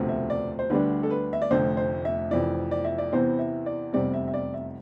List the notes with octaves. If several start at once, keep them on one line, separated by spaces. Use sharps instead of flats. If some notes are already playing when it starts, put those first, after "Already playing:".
Already playing: E1 D2 C3 F3 A3
E5
D5
C5
D2 D3 G3 D4 B4
A4
B4
E5
D5
F1 F2 D3 A3 C5
C5
E5
F1 F2 E3 D5
D5
E5
D5
E2 C3 E3 B3 C5
E5
D5
F1 E2 C3 G3 C4 D5
E5
E5
D5
E5